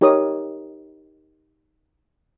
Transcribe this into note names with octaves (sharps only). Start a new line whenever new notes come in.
D#4 G4 A#4 C#5 D#6